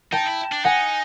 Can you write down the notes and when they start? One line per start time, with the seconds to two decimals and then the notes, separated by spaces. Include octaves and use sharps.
0.13 D#4 G5 A5
0.26 E4
0.52 D4
0.65 D#4 F#5 G#5